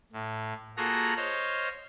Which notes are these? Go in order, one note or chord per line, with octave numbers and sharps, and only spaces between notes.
A2
A#3 F4 F#4 G#4 A4 A#5
C5 C#5 D#5 F5